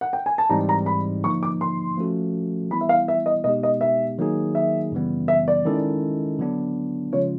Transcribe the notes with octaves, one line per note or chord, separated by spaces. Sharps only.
F#5
G5
G#5
A5
G#2 E3 G3 C4 D#4 A#5
A#5
B5
D3 F3 A#3 D#4 C#6
D6
C6
F3 A3 C#4 F#4 A4
E3 G3 B3 E4 B5
E5
F5
E5
D#5
B2 G#3 B3 D#4 G4 D#5
D#5
E5
D#3 F#3 A#3 D#4 G#4
E5
F#2 C#3 E3 G3 B3
E5
D5
D#3 G#3 C#4 E4 A4
D3 F#3 B3 D4
C#3 F3 G#3 C#4 F4 C#5